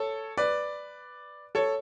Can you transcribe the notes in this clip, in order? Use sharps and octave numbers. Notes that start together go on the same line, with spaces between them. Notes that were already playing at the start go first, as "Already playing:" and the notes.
Already playing: A4 C#5
B4 D5
A4 C#5